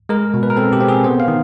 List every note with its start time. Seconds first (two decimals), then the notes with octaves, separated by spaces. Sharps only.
0.09 G#3 A#4
0.34 B2
0.43 B4
0.50 A#4
0.57 C4 A4
0.73 G4
0.81 C4
0.88 G#4
1.04 B3 C5
1.20 F5
1.28 D#3